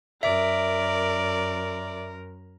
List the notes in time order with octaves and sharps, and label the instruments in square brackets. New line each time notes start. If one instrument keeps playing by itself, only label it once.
[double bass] F#2 [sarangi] A#4 [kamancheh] D5 [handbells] E5